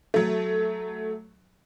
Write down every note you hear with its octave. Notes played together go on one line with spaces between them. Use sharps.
F#3 A3